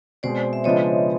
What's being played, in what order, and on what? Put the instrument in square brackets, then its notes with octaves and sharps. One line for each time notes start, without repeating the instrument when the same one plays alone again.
[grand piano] B2 G#3 C4 [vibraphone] C5 D5
[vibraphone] E5
[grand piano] C#3 F3 G#3 B3 D4 [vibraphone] C#5 D#5